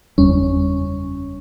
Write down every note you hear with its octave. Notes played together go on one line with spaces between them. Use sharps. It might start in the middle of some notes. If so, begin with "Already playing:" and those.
F#1 E2 G3 C#4